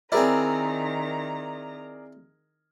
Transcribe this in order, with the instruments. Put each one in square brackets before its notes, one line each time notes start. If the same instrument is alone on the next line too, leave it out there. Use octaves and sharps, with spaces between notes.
[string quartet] D#3 A#5 [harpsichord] C4 E4 [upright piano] G#4 A#4 D5